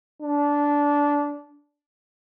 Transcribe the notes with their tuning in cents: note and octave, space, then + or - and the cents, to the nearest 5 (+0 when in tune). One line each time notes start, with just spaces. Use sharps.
D4 -15